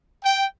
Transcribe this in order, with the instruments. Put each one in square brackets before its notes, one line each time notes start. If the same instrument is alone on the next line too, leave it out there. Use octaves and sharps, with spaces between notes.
[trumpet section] G5